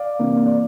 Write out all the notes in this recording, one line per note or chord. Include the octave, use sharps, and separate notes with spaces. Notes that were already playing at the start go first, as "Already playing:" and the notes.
Already playing: D5 F5
C3 E3 A#3 D4
D5